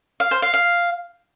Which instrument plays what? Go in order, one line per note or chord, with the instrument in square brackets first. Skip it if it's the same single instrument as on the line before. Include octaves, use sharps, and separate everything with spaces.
[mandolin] F5
C5
F5
F5